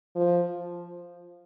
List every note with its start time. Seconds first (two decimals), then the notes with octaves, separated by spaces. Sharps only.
0.15 F3